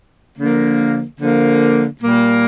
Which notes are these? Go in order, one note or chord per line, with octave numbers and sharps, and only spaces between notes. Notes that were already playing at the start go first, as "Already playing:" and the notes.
D3 F3 A#3
D3 F3 A#3
A#2 G3 A#3